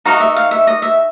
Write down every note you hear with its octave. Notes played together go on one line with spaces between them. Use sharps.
D#4 F#4 A#4 D#5 F5
E5
F5
E5
D#5
E5